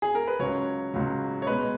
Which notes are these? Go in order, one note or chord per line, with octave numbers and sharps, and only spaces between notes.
G#4
A#4
B4
C#2 C#3 F#3 C#5
C#2 C#3 F#3
C#5
B2 G#3 B3 B4